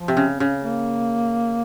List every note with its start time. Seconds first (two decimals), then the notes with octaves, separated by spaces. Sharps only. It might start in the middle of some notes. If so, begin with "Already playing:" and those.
Already playing: F3
0.08 C3
0.17 C#3
0.40 C#3
0.63 A#3